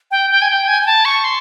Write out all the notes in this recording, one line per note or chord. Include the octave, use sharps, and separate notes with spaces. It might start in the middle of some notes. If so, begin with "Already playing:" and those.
G5
G5
G#5
G5
G#5
G#5
A5
C#6
C6